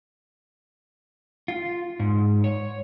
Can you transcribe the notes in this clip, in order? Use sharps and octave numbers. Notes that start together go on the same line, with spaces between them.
F4
G#2
C#5